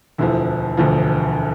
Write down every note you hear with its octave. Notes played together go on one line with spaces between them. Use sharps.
E1 D2 D3 E3 F3 E4
E1 D2 D3 F3